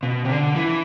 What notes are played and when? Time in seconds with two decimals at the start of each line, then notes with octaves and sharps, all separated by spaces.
0.03 B2
0.25 C3
0.30 D3
0.56 E3